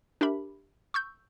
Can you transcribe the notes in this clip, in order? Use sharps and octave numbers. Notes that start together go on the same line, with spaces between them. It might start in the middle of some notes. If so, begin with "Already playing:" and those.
D4 G4 A#4 E5 B5
C#6 E6 G6